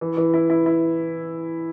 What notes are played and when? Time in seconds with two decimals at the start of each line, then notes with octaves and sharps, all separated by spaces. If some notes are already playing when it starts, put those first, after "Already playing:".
0.01 E3
0.17 E3
0.34 E4
0.50 E4
0.66 E4